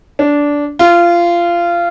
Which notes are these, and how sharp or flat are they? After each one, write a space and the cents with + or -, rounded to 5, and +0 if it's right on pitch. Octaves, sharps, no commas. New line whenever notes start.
D4 -15
F4 -20